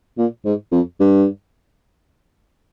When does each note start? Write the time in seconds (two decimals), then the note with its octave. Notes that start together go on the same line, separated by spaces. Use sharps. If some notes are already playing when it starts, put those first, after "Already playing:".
0.18 A#2
0.45 G#2
0.72 F2
1.00 G2